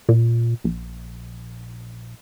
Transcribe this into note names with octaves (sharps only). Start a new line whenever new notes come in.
A#2
A#1